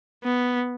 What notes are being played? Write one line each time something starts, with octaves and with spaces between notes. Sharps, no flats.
B3